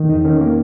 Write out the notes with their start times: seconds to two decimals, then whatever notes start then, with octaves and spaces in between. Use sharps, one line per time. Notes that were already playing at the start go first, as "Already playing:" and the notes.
Already playing: D#3
0.09 E2 D#4
0.25 D#3 C#4
0.41 A#3